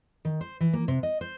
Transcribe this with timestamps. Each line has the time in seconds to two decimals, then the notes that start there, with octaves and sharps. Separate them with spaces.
0.25 D#3
0.41 C5
0.60 E3
0.73 A#3
0.88 C3
1.03 D#5
1.21 C5